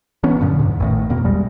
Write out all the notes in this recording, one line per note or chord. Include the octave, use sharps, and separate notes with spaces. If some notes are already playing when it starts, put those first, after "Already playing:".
E3 B3 C#4
F#2 A#2 D3 F3
E2 G#2
A1 A2 D#3
D#1 E2 B2 A#3
A#1 G3 G#3